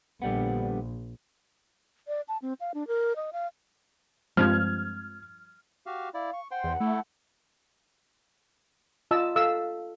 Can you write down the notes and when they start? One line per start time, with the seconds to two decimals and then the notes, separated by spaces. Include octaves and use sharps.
0.22 A#1 D3 G3 B3
2.08 D5
2.28 A5
2.42 C4
2.60 F5
2.74 D4
2.88 A#4
3.16 D#5
3.33 F5
4.37 G2 F3 G#3 C4 F6 G#6
5.86 F#4 G4 F5
6.14 E4 D5 F5
6.33 C#6
6.51 C5 F#5 G5 C6
6.64 E2
6.80 A3 E4 A4
9.11 F4 D#5 A5 E6
9.36 A4 F5 E6